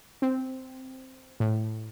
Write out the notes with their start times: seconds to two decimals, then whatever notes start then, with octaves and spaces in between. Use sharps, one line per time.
0.22 C4
1.40 A2